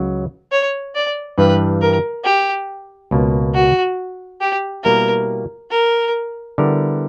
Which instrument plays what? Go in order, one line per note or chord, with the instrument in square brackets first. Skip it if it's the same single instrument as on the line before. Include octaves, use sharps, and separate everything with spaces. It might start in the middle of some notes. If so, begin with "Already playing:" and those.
Already playing: [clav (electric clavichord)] C#2 C#3 F#3
[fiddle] C#5
D5
[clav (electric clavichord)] G2 E3 G3 [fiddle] B4
[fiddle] A#4
G4
[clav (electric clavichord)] C#2 B2 A#3
[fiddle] F#4
G4
[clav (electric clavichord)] B2 G3 A#3 E4 [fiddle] A#4
[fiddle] A#4
[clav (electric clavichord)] D3 G3 B3 E4 A#4